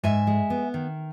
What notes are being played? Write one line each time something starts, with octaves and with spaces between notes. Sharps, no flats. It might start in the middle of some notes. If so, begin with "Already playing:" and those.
G#2 E5 G#5
G#3
B3
D#3